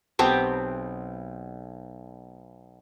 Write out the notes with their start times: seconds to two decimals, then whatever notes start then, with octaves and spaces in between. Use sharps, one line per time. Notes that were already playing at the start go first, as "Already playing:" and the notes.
0.19 B1 B3 C4 G4 A5